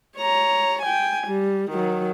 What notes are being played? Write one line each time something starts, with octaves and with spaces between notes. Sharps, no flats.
C#5 A#5
G5 G#5
G3
D#3 F#3